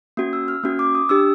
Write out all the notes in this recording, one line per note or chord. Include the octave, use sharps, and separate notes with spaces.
A#3 C#4 F#4
E6
F6
A#3 C#4 F#4
D6
D#6
D4 G4 E6